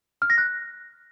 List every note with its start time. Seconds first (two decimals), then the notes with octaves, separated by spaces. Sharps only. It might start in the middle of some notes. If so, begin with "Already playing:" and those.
0.22 F6
0.30 A#6
0.38 F#6